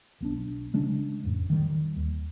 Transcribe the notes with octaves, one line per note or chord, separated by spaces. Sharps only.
B1 B3 D4
C#3 G#3 C#4 D4
A1 F2
D#3 G3
D#2